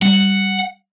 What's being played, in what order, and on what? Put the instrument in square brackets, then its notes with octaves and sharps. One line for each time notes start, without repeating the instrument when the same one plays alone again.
[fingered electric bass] G3 [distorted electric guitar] F#5